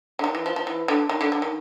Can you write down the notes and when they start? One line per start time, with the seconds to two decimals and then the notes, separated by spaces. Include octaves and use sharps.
0.19 D3
0.24 D#3
0.35 E3
0.46 F3
0.56 F3
0.67 E3
0.88 D3
1.09 D#3
1.21 D3
1.32 D3
1.42 D#3